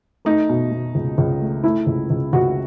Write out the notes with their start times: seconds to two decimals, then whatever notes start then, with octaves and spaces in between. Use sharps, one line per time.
0.25 A3 D#4
0.49 B2
0.71 B2
0.95 C#2
1.18 C#2
1.40 A3
1.64 A3 E4
1.87 C#2
2.10 C#2
2.33 C#2 F#4